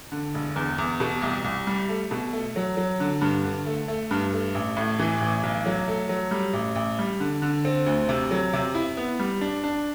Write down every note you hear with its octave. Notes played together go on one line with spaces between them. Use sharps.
D3
E1
E2
E2
B2
C2
C2
G3
A3
B2
A3
F#3
F#3
D3
G2
D3
A3
A3
G2
A3
A1
A2
E3
A1
B1
F#3
A3
F#3
G3
A1
A1
G3
D3
D3
C4
D2
C3
F#3
C3
E4
B3
G3
D4
D4